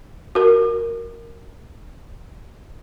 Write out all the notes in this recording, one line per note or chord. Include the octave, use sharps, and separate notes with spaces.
F#4 A#4